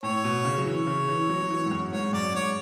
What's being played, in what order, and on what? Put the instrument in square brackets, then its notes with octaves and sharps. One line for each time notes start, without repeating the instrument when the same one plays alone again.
[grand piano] A2 [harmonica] C#5
[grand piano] B2
C#3
F#3
[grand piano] E3 [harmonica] C#5
[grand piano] C#3
E3
F#3
F#3
E3
G#2
F#2
[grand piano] G#2 [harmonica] C#5
[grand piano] F#2 [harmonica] D5
[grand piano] G#2 [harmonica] C#5